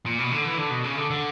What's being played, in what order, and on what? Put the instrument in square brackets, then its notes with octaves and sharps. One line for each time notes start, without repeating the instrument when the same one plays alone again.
[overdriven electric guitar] A#2
B2
D3
E3
D3
B2
C#3
D3
D3